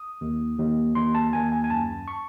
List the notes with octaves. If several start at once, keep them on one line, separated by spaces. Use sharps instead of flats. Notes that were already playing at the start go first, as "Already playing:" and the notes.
Already playing: D#6
D#2
D#2
D#2 C6
A5
D#2 G#5
G#5
G#5
F#2 A5
C#6